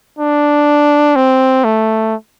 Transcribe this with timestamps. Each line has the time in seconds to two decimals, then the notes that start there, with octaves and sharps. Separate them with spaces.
0.19 D4
1.16 C4
1.64 A3